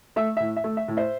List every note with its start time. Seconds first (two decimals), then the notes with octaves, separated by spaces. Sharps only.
0.16 A3 E5
0.37 A2 E5
0.56 E5
0.64 A3
0.77 E5
0.88 A2
0.97 C5 E5